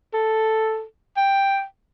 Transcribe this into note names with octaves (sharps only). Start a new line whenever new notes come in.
A4
G5